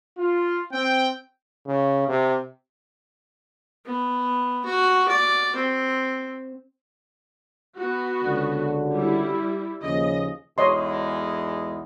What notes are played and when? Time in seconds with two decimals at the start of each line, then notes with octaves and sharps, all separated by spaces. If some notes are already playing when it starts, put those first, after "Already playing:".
0.18 F4
0.72 C4 G5
1.66 C#3
2.08 C3
3.85 B3
4.65 F#4
5.09 D5
5.56 C4
7.76 B3 F#4
8.24 C#2 D3 F#3
8.93 G3 E4
9.83 D#2 C#3 F3 D#5
10.58 B1 E2 G#3 C#5 D#5 C6